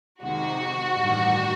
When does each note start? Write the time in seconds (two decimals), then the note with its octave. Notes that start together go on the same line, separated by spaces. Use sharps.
0.23 F2 C3 D#3 G#3 F#4
0.95 A1 G2 D#3 G3